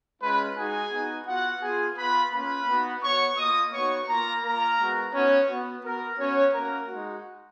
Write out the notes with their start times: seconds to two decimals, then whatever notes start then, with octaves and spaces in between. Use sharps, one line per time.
0.22 G#3 C#4 F4 B4 B5
0.57 G#3 D#4 F#4 G#4 G#5
0.92 B3 D#4 F#4
1.27 B3 F4 F#4 F#5
1.62 B3 F4 G#4 G#5
1.97 B3 F4 B4 B5
2.32 A#3 C#4 F4 B4 B5
2.67 B3 D#4 F#4
3.02 B3 F#4 C#5 C#6
3.38 A#3 F4 D#5 D#6
3.73 B3 D#4 F#4 C#5 C#6
4.08 A#3 F4 A#4 A#5
4.43 A#3 F4 A#4 A#5
4.79 G#3 B3 F#4
5.13 B3 C#4 D#4 F#4 C#5
5.48 B3 F#4
5.84 B3 F#4 A#4
6.19 B3 C#4 F#4 C#5
6.54 A#3 C#4 F#4 A#4 A#5
6.89 G#3 D#4 F#4